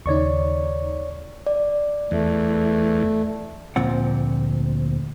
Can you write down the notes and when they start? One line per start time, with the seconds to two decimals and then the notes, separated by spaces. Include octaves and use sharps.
0.06 D#2 C#3 D#4 C#5 D5 C#6
1.46 D5
2.11 E2 A3
3.76 D2 A#2 F3 C4 F#5